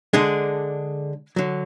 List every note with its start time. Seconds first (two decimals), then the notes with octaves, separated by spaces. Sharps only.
0.13 D3 G#3 D4 G#4
1.36 D3 F#3